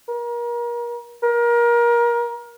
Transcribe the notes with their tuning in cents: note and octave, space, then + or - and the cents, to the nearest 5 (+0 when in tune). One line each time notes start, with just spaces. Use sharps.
A#4 +35
A#4 +25